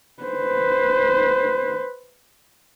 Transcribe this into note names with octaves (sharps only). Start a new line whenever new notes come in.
B4 C5